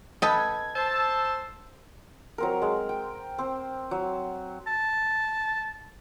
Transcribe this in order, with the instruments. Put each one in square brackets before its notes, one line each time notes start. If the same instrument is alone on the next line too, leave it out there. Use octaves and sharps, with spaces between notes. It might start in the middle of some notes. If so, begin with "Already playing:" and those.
[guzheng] A4 B4 [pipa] D#5 G5 [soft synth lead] G#6
[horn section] C5 A5 [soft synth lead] E6
[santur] F#3 C4 A#4
G#3
G5
C4
F#3
[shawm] A5